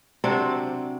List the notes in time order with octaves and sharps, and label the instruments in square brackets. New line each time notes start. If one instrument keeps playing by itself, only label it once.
[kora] C3 F#3 C4 D4